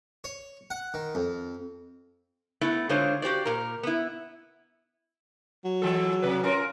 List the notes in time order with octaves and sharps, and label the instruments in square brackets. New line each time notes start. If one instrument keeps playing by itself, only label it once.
[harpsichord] C#5
F#5
D#3
F2
[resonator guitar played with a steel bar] A3 B3 E4
D3 G#3 D4 F4 C5 C#5
F#4 G4 C5 D5
A#2 A#4
B3 E4
[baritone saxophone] F#3
[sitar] E3 G#3 A4
C3 B4
C#4 F4 A#4